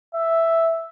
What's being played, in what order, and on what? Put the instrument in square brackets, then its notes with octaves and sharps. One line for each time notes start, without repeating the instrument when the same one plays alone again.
[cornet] E5